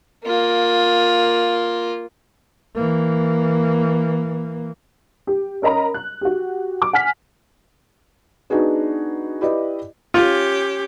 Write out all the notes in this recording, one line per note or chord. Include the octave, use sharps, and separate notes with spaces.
A#3 F4
E3 A#3
G4
C#4 A#4 D#5 A#5 B5
F#6
F#4 G4
D6
F#5 G#5 F6 B6
B3 D4 D#4 F#4 G#4 B4
E4 G4 B4 D5 D#5
C#4 F4 G4